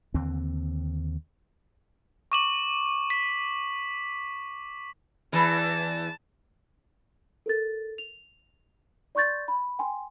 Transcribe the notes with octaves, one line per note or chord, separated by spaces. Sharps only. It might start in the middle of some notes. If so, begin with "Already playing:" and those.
D#2 D3 C4
C#6 D6 F#7
B6
E2 E3 B4 A5
A4 A#4 A6
F7
D5 C6 C#6 G6 A6
B5
G5 G#5 C6